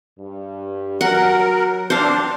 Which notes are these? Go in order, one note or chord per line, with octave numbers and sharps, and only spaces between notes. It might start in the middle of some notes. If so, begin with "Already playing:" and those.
G2
F#3 A#4 F#5
C4 D4 C5 F5